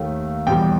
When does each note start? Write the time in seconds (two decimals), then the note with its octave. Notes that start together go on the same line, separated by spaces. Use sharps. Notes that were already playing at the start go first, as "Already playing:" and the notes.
Already playing: D#2 D#3 A3
0.47 E2 B2 G3 G5